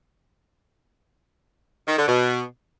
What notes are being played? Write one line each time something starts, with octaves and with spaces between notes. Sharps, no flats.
D#3
D3
B2